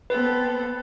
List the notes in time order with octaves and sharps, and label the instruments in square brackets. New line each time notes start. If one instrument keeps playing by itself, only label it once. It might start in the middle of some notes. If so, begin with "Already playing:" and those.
[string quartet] B3 C4 A4 [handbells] B4